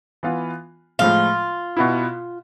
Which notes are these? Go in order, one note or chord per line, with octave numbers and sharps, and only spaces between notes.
E3 B3 F4
A2 F3 G#3 F4
B2 B3 E4